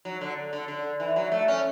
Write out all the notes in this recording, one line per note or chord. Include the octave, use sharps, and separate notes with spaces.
F#3
D3
D3
D3
E3
F#3
A3
C#4